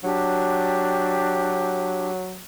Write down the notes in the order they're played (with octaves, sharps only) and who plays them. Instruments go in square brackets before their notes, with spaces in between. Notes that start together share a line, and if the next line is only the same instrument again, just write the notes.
[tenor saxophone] F#3 [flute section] D4 G4